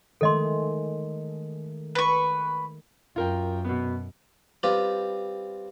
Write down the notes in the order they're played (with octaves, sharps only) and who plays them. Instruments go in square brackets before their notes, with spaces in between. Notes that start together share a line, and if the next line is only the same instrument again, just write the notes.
[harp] D#3 G#3 A3 [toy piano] A4 D#5 C6
[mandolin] B4 C#6
[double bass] F#2 [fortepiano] F4 A#4 G5
[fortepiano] B2 B3
[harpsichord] G3 C4 F4 G4 B4